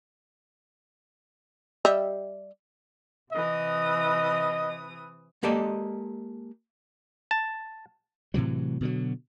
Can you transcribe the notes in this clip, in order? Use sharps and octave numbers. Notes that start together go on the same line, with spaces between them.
G3 D#5 E5
C3 E3 D#5 D#6
G#3 A#3 G4 A4 D5 D#5
A5
A2 C3 E3 F#3
B2 D3 F#3